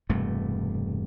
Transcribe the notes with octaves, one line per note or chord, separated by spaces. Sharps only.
E1 G2 C3 A3